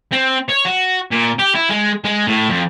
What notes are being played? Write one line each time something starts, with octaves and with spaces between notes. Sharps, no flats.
C4
C#5
F#4
A#2
G4
E4
G#3
G#3
A2
F2